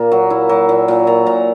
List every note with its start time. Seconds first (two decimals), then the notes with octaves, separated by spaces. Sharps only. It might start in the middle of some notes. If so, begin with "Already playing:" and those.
Already playing: A#2 A#3
0.12 F#3
0.30 E4
0.49 F#3
0.69 A#2
0.88 A#2
1.07 A#2 A#5
1.26 A#2 A#5